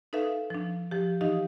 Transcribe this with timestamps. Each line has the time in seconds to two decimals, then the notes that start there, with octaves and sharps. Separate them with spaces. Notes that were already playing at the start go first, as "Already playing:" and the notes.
0.13 D#4 A4 B4 E5 F5
0.50 F3 D4
0.91 F3 G4
1.21 E3 D#4 G4 D#5 F5